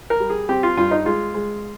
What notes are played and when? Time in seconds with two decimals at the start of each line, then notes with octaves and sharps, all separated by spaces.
0.10 A#4
0.20 G3
0.30 G#4
0.49 C4 G4
0.63 F4
0.77 G2 F4
0.91 D#4
1.05 G#3 F4
1.34 G#3